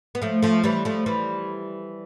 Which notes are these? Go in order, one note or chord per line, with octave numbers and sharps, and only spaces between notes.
B3
F3 A3
F3 A3
E3 G3
F3 A3
E3 G3